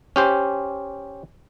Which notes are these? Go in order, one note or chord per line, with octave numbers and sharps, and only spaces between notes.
C#4 G4 C5